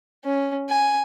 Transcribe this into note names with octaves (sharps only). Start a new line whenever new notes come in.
C#4
G#5